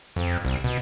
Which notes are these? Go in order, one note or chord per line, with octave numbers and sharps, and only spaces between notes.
F2
C2
B2